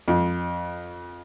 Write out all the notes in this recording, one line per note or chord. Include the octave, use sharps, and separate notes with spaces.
F2